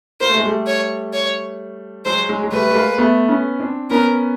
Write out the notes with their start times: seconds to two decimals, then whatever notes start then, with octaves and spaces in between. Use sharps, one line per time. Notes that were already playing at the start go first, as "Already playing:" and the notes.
0.20 A#3 C5
0.29 A3
0.37 G#3
0.45 G3 A3
0.67 C#5
1.13 C#5
2.05 F#3 G#3 C5
2.29 F#3 G#3
2.43 G#3
2.52 G3 A3 B4
2.71 A3
2.75 G#3 A#3
2.98 A3 B3
3.28 B3 C#4
3.60 C4 D4
3.90 B3 C#4 A#4